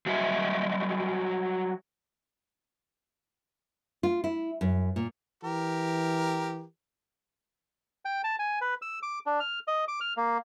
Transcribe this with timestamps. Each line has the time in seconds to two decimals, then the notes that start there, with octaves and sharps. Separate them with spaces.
0.06 F#3 G3 F#4 D#5 E5
4.03 F4
4.24 E4
4.61 F#2
4.96 A#2
5.44 E3 G4 A#4
8.05 G5
8.24 A5
8.39 G#5
8.61 B4
8.82 E6
9.03 D6
9.26 D4
9.40 F6
9.68 D#5
9.88 D6
10.01 F6
10.17 A#3